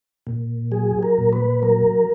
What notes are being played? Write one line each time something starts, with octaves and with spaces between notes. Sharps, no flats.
A#2
F#3 G#4
A#4
A#2
B4
F#3 A#4